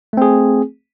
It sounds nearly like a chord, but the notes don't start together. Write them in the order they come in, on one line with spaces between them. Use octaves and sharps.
A3 C4 G#4